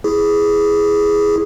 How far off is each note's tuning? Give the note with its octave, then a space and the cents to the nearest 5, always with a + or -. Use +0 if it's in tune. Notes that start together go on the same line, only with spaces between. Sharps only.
E4 +0 G#4 +0